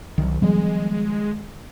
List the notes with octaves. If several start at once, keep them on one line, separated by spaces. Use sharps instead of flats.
C2 D#3 F#3
F3 G3 G#3 B3